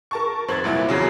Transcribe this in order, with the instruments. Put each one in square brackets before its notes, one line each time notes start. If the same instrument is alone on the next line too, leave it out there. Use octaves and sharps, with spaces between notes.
[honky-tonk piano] A#4 A5 C#6
[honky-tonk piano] G#1 C5 F#7 [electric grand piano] F2 G#6 A6
[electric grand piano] C2 A#2 E4 [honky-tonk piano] F#3
[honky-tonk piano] F1 [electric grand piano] E2 C#3 F#3